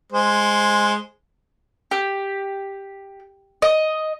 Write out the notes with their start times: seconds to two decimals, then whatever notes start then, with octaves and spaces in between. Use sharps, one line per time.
0.12 G#3 C5
1.91 G4
3.62 D#5